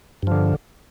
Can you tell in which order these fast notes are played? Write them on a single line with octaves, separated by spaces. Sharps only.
G2 F3 D3